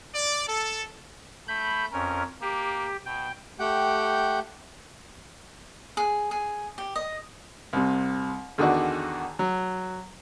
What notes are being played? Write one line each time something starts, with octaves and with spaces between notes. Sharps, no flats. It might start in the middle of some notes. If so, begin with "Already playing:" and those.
D5
A4
A3 B5 G6
F2 C#4 A#4
A#3 G4
B2 G5
A3 G4 F#5 G5 G6
G#4
G#4
G4
D#5
C2 C3
E2 D3 D#3 F#4 D5
F#3